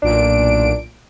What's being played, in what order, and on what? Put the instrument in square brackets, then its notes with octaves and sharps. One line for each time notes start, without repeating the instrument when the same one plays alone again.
[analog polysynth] B1 A#2 D7 [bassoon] D4